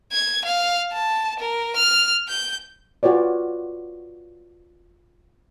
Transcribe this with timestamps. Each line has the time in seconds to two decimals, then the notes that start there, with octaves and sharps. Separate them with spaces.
0.13 G#6
0.45 F5
0.93 A5
1.39 A#4
1.76 F6
2.28 G6
3.03 F4 F#4 B4 C#5 D5